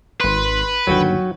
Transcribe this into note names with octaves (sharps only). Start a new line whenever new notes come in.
G#1 B4 C6
G1 D#2 F#3 F#4 G5